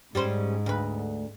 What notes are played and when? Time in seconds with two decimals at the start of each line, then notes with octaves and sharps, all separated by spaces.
0.15 G#2 G3 C#4 C5
0.66 D2 B4